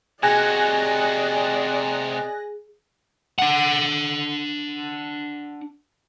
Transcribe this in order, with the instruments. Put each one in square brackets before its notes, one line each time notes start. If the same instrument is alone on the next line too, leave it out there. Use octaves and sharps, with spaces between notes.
[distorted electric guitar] C3 F#4 [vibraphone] G#4 [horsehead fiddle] D5 D#5 [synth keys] G#5 F#6 A#6
[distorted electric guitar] D4 F#5